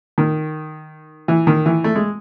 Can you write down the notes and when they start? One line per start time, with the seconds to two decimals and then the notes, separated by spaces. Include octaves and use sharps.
0.18 D#3
1.28 E3
1.47 D#3
1.66 E3
1.84 A3
1.95 G#3